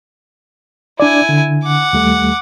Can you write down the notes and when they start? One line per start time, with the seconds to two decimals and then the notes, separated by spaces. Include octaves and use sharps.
1.00 D4 E4 D5 G#5
1.29 D3
1.64 F#5 D6
1.93 D#2 G3 A3